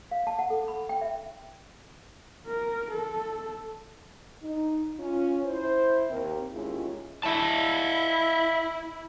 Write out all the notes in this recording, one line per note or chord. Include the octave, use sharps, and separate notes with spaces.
F5
A5
F#5
A4
B5
G5
E5
A#4
A4
D#4
C#4 F4
E4 C5
D#2 C4 A#4
D#2 G#3 C#4 E4 F4 G#4
E4 D#5 E5 A5